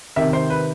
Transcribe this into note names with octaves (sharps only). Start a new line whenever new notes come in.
C3 D#3 E5
C5
B4